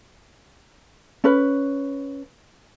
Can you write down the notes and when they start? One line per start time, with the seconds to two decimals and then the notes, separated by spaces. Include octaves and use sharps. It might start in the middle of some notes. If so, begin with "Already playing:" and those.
1.24 C#4 B4